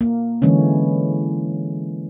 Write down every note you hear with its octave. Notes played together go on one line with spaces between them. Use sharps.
A#3
D3 E3 G#3 C#4